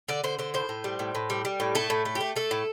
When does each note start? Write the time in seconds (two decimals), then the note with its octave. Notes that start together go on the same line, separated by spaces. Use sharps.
0.08 D3 D5
0.24 D3 C5
0.39 D3 C5
0.54 A2 C5
0.69 A2
0.84 G3
0.99 A2
1.15 A2
1.30 G3
1.45 G3
1.60 A2
1.75 A3 A4
1.90 A2
2.05 A3
2.15 G4
2.21 A3
2.36 A3 A4
2.51 A2